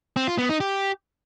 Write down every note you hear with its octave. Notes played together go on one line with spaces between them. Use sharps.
C4
F4
B3
D#4
G4